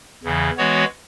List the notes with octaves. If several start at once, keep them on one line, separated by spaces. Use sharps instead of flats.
E2 C#3 E3
E3 G#3 B3 F#4 C#5